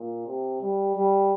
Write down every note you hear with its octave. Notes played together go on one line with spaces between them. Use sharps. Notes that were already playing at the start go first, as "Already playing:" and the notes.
Already playing: A#2
C3
G3
G3